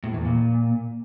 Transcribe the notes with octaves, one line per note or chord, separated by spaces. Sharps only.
A2
E2
A#2